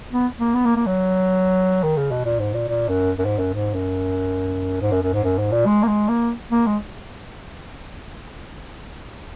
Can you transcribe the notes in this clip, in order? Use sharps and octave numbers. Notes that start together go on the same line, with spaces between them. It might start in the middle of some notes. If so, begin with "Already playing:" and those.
B3
A#3
B3
A#3
A#3
F#3
D#3
C#3
B2
A#2
G#2
A#2
A#2
F#2
F#2
G#2
F#2
G#2
F#2
G#2
F#2
F#2
G#2
F#2
G#2
A#2
G#3
A#3
G#3
A#3
A#3
G#3